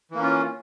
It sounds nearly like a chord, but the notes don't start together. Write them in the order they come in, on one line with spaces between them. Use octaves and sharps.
E3 A#3 C#4 F4